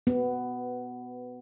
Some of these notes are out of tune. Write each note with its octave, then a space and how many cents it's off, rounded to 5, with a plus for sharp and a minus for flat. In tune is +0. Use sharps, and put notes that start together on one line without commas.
B3 +10